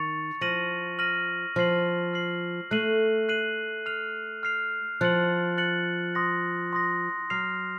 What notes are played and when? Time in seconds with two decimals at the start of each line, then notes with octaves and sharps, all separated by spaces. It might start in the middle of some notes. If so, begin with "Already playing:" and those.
Already playing: D#3 C#6 A6 C#7 F7
0.41 F3 F6 A#6 D#7 F#7
0.99 F6 A#6 D#7 F#7
1.56 F3 F6 C7 F#7
2.13 F6 C7 F#7
2.71 A3 F#6 C7 D#7 F#7
3.29 F#6 C7 D#7 F#7
3.86 F6 C7 F7
4.43 F6 C7 F7
5.01 F3 F#6 A6 C#7 F#7
5.58 F#6 A6 C#7 F#7
6.15 C6 D#6 A#6
6.73 C6 D#6 A#6
7.30 F#3 F6 C7 F7